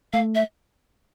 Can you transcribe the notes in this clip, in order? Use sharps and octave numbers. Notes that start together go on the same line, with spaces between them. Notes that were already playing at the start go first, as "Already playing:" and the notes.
A3 F5
E5